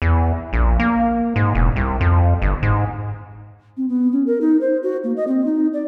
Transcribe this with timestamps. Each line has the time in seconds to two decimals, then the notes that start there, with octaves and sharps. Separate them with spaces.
0.02 E2
0.53 A#1
0.80 A#3
1.36 G#2
1.55 E1
1.76 C2
2.01 F2
2.42 G1
2.63 G#2
3.77 C4
3.88 B3
4.12 C#4
4.27 A#4
4.41 D#4
4.61 C5
4.83 F#4
5.04 A#3
5.16 D#5
5.27 C4
5.46 D#4
5.73 D5